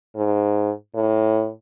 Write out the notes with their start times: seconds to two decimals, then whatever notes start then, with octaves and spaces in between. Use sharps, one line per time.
0.16 G#2
0.94 A2